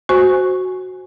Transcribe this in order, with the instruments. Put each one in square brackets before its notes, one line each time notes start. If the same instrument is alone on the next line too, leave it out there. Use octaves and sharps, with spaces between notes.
[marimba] F#4 C5 G#5 C#6